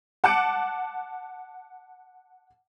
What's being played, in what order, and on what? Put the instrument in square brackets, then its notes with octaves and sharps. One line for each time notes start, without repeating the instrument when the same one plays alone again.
[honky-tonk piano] F#5 A5 D6 F#6 C#7 D7